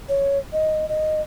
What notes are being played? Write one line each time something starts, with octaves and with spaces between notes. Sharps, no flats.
C#5
D#5
D#5